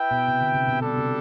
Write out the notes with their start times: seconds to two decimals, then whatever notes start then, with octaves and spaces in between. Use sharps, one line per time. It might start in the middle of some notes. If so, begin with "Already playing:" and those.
Already playing: E4 B4 E5 G5
0.11 B2
0.28 C3
0.41 D3
0.54 C3
0.67 B2
0.80 B2 G3 D4 A4
0.97 C3